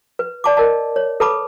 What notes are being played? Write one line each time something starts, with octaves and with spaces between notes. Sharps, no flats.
B4
D5 A5 D6
A#4 D#5 A5
C#5
A4 B4 A5 B5 D6